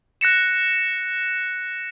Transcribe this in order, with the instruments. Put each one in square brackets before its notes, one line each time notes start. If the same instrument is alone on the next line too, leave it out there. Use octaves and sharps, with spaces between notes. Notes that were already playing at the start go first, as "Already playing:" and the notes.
[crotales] F#6 A#6 C#7 E7